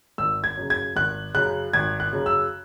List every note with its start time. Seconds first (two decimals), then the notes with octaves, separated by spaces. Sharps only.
0.18 G#1 E6
0.44 G#6
0.57 F#2 C#3
0.70 G#6
0.96 G#1 F#6
1.34 F#2 C#3 F#6
1.74 G#1 G#6
2.00 F#6
2.13 F#2 C#3
2.26 E6